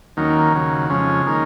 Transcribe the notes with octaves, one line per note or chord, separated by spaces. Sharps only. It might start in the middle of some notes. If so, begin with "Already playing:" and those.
D#2 D#3 F#3 A#3 C#4
D#2 C#3 F#3
F2 C#3 G#3 C#4
D#3 A#3 C#4 G#4